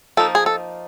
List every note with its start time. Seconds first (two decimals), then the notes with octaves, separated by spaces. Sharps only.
0.17 F3 A#3 D#4 A4
0.35 G#4
0.46 A4